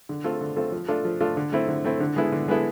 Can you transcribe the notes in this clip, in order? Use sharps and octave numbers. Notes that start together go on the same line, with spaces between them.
D3
A3 C4 F4 A4
D3
A3 C4 F4 A4
F3
A3 D4 F4 A4
F3
A3 D4 F4 A4
D3
A3 C4 E4
D3
A3 C4 E4
D3
G#3 B3 E4 A4
D3
G#3 B3 E4 A4